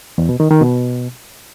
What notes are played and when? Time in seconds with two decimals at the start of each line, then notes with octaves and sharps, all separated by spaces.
0.18 E2
0.29 B2
0.40 D#3
0.51 D#3
0.62 B2